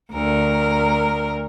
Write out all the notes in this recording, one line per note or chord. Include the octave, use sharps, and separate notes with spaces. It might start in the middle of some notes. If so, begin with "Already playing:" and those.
D2 A#4